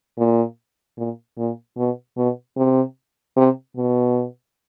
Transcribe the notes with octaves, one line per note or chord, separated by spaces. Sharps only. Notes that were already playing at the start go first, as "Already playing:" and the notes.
A#2
A#2
A#2
B2
B2
C3
C3
B2